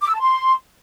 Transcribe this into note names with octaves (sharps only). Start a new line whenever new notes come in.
D6
E6
A5
C6